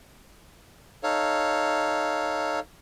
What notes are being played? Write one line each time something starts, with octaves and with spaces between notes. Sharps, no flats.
D#4 A4 C#5 F5